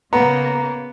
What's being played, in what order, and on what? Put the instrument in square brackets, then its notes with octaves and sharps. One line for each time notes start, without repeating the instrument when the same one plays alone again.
[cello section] C#3 A#3 [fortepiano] B3 [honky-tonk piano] A#5